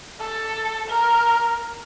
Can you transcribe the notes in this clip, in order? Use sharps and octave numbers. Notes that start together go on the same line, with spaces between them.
A4
A#4